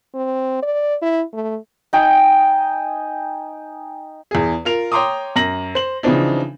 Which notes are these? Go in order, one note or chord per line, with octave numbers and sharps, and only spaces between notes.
C4
D5
E4
A3
D#4 G5 G#5
E2 G#4
F4 A#4 F7
C#5 G5 A#5 C6 D6 D#6
F#2 A#6 F#7
C5 F#7
C#3 E3 F3 C4 D4 D#4